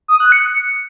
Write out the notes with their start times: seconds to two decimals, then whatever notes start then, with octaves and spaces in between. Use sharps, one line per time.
0.08 D#6
0.20 F#6
0.32 C#7